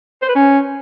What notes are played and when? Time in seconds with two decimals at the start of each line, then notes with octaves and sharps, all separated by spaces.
0.22 C5
0.29 B4
0.35 C#4